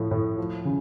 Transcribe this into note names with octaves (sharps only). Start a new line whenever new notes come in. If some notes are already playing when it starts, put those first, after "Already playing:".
Already playing: A2 F3
A2
F3
C#3